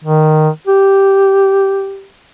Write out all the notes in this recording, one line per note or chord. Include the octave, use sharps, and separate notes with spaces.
D#3
G4